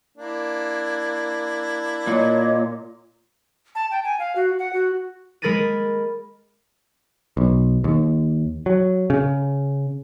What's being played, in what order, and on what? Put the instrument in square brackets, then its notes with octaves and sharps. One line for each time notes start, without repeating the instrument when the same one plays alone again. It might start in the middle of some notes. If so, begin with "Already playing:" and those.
[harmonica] A#3 D4 E4
[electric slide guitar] A#2 [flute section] C#5 D#5
[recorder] A5
G5
G#5
F5
F#4
F#5
F#4
[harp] G#3 A#4 B5 A6 A#6 D#7
[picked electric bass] B1
D#2
F#3
C#3